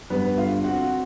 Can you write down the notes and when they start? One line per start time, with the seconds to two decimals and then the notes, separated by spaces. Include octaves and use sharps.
0.10 G2 B3 B4
0.37 D3 F4 F5
0.64 C4 F#4 F#5